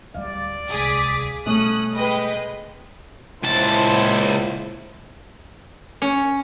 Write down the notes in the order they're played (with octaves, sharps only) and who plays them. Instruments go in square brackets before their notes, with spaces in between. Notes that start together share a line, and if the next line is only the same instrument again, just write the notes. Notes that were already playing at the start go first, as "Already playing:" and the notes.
[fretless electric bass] D1 G3 [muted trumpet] D5 [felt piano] F5
[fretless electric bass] D1 C2 G#3 [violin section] G#4 D6 B6
[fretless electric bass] B2 G3 [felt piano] A3 [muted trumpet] C#4 [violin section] D#6 F#6
[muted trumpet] G#3 [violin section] B4 D#5 G5
[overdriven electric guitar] C#2 A5 [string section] A#2 E4 C5
[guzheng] C#4